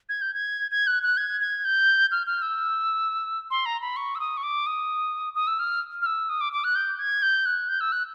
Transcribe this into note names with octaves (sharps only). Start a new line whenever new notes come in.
G#6
G6
G#6
G#6
F#6
F#6
G#6
G#6
G6
F6
F6
E6
C6
A#5
B5
C#6
E6
D#6
C#6
D6
D#6
D#6
E6
F6
F6
E6
D#6
D6
D6
F#6
G6
G#6
G6
F#6
G6
E6
F#6